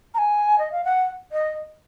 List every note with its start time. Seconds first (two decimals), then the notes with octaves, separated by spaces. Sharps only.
0.14 A#5
0.18 G#5
0.59 D#5
0.72 F5
0.85 F#5
1.32 D#5